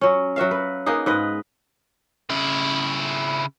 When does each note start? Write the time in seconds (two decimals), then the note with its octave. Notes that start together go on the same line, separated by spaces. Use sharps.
0.01 F#3 C#4
0.36 F#3 F#4 E5 F5
0.51 B4
0.86 A#3 B3 D#4 G#4
1.06 G#2 B4 D#5
2.30 C#3 E4